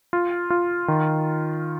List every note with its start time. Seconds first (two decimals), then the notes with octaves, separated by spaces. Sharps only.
0.13 F4
0.50 F4
0.88 D#3